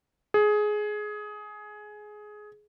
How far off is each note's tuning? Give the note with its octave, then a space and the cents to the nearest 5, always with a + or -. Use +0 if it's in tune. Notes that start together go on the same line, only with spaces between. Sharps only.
G#4 +15